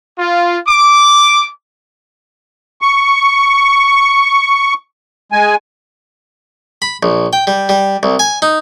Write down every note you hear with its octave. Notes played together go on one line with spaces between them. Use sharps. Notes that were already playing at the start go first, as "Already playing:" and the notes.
F4
D6
C#6
G#3 G#5
B5
A#1
G5
G3
G3
C2
G#5
D#4